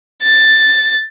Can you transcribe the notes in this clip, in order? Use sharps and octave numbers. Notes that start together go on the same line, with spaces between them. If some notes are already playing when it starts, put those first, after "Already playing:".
A6